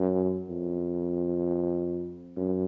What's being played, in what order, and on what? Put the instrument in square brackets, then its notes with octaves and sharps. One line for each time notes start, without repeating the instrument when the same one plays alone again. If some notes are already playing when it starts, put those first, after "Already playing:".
Already playing: [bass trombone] F#2
F2
F#2